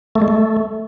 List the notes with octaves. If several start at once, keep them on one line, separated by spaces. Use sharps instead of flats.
A3
G#3
A3